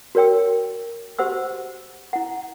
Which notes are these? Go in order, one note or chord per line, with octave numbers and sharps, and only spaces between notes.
F#4 A#4 C#5 G5 E6
F#4 G4 C5 F#5 E6
E4 F#5